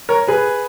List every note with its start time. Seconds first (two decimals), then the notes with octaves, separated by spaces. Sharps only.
0.09 A#4 C#5
0.28 G#4 B4